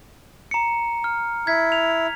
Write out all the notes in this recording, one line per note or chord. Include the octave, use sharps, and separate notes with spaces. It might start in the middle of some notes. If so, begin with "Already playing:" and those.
A#5 C#7
F6
E4 G#6 B6
F7